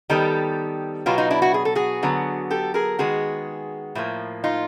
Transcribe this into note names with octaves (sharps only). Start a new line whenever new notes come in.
D#3 G3 B3 G4 A4
B2 F#3 B3 F4 G4
D#4 F4
D4 E4
E4 F#4
G#4
A4
F#4 G#4
D3 F#3 B3
G4 A4
G#4 A#4
D#3 G#3 B3 F#4 G#4
A2 F3 A#3
D#4 F4